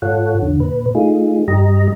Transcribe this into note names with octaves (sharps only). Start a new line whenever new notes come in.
G#2 F4 A4 C#5 F#5
E2 D3
A#2 B4
A3 D#4 F4 G#4
G2 G3 G4 D#5 A#5